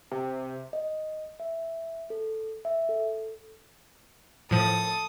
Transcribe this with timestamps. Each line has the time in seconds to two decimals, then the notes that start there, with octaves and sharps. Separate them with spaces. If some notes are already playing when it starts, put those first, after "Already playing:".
0.12 C3
0.73 D#5
1.40 E5
2.10 A4
2.65 E5
2.89 A4
4.51 A2 F3 A4 D#6